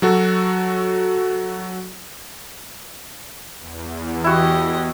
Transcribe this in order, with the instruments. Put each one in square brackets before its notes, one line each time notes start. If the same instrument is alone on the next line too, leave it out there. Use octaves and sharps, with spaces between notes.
[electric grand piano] F#3 F#4 A4
[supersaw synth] E2
[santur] E4 F#4 [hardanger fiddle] G4 D#5